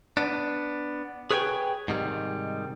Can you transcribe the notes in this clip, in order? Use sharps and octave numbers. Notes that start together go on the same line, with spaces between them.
B3 D4
G#4 B4 C#5 D5 G5 G#5
G#2 C3 D#3 G3